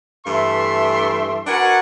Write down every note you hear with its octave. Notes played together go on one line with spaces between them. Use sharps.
G2 E3 A3 E5 C6
D4 F#4 A#4 B4 F#5 G#5